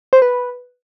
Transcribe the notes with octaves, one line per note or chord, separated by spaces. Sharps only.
C5
B4